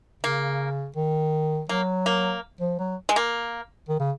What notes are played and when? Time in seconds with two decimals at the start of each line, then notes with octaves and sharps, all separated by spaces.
0.23 C#3 A#3
0.96 D#3
1.69 F#3 A#3
2.06 A#3
2.61 F3
2.79 F#3
3.09 G#3
3.16 A#3
3.89 D#3
4.00 C#3